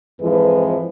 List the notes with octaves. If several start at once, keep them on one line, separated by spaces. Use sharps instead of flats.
F2 G#2 E3 F3 G#3 B4